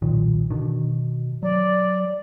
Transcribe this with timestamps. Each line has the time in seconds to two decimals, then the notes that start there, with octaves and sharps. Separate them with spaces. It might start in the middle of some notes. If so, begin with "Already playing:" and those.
0.02 D#1 B1 A#2 D#3
0.50 B2 D3 D#3
1.43 F#3 D5